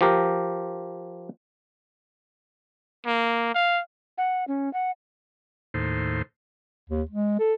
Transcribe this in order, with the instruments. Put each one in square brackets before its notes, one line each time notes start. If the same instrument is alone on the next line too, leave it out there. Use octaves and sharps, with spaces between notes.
[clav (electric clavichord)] F3 G4 A#4
[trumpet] A#3
F5
[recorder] F#5
C#4
F#5
[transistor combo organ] D#2 A2 C5
[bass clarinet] D#2
G#3
A4